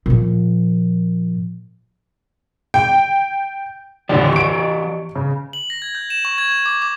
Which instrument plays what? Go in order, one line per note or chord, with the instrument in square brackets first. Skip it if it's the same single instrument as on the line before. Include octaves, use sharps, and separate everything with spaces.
[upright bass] A#2 F3
[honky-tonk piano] G5
[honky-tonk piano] D#2 A2 D3 [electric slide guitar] E3 G4 D5
[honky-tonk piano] C#6 D7
C#3
[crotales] F#7
A#6
G#6
G6
E7
C#6
G#6
G#6
D6
D6